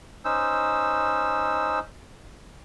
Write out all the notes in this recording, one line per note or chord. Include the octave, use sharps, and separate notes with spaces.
C#4 D#4 C5 E6